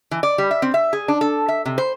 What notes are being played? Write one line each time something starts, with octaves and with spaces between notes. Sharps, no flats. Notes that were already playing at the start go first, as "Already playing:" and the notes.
E3
D5
G3
E5
C4
E5
G#4
D4
A4
E5
C3
C5